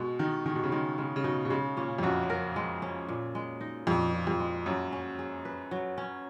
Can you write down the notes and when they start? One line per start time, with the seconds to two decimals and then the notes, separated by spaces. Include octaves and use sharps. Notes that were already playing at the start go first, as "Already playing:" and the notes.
Already playing: B2 G#3
0.19 D#3 D#4
0.46 D#3 G#4
0.55 B2
0.63 C#3
0.72 D#3 G#3
0.98 C#3 G#3
1.16 C#3
1.24 B2 D#4
1.45 B2
1.50 C#3 G#3
1.77 A#2 C#4
1.99 F2
2.03 F#2 F#4
2.30 A#4
2.56 G#3
2.82 C#4
3.09 A#2
3.35 G#3
3.61 D#4
3.87 F2 A#2
4.14 A#2
4.27 F2
4.40 G#3
4.66 F#2 F#3
4.93 C#4
5.19 G#4
5.45 B4
5.71 F#3
5.98 C#4